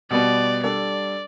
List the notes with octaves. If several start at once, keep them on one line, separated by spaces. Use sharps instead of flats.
B2 G3 B3 D5
G3 D4 A4 D5